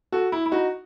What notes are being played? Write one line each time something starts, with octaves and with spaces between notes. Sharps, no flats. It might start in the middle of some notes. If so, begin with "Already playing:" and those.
F#4 A4
E4
E4
D#4 F#4